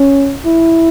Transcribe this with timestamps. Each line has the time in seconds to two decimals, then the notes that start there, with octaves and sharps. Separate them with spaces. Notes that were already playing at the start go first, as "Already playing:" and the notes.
Already playing: C#4
0.46 E4